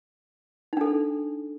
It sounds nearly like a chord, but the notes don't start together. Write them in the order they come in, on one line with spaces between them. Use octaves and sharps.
D#4 D4 A4